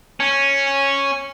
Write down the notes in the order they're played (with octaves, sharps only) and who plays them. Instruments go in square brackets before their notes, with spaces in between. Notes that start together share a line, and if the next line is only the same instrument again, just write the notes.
[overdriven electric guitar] C#4